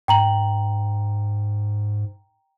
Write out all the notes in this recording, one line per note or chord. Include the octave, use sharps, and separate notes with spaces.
G#2 G5 A#5 F#7